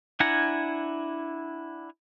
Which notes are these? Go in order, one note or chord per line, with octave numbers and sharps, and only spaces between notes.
D4 E4 F#5 G#5 A#5